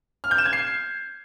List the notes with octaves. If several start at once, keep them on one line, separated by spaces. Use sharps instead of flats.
F6
G6
E7
G#6
C7